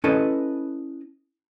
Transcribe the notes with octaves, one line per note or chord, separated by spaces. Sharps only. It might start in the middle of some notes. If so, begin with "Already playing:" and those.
C#4 E4 A4 B4 D#5